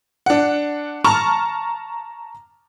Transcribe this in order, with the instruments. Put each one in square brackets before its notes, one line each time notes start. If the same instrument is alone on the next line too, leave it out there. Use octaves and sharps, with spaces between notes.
[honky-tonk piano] D4 F#5
A5 A#5 C#6 F6